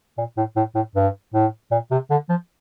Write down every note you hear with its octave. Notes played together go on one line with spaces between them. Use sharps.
A#2
A2
A2
A2
G2
A2
A#2
C3
D3
F3